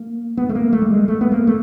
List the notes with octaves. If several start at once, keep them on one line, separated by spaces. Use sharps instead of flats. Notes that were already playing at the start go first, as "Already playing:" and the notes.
Already playing: A#3
B3
A3
A#3
A3
G3
G#3
A3
B3
A#3
A3